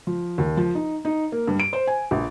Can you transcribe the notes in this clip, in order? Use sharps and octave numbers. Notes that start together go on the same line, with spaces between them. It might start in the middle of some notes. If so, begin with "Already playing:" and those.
F3
D#2
F3
D#4
D#4
A#3
G2
D7
C5
G#5
A#1